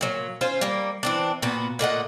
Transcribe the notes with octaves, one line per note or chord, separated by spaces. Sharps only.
A#2 F#3
C#4 F4 C5
G3 A#3
E3 C4 D4
A#2 B3 F#4
A#2 A3 D#5 F#5